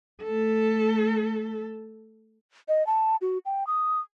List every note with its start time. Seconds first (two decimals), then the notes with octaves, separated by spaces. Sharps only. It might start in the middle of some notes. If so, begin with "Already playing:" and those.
0.23 A3 A4
2.68 D#5
2.87 A5
3.21 F#4
3.46 G5
3.67 D#6